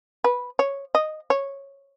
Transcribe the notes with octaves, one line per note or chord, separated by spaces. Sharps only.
B4
C#5
D#5
C#5